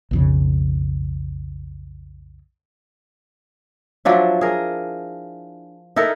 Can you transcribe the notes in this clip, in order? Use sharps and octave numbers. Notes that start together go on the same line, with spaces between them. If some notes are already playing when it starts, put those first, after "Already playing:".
B1 F2 C#3
F3 F#3 D4 E4
G#4 A#4
D#4 E4 A4 A#4